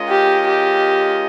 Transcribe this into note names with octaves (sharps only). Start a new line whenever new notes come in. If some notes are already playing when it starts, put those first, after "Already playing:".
Already playing: G#3 C#4 F4 A#4 D#5
G4
G4